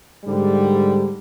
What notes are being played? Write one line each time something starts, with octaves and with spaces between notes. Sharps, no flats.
G#2 D3 G3